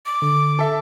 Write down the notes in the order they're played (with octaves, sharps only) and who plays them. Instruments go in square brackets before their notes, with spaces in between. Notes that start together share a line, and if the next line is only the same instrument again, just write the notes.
[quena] D6
[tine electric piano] D3
[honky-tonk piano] A4 E5